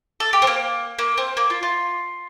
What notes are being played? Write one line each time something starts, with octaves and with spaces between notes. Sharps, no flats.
A4
G4
C4
A#3
A#3
C4
A#3
F4
F4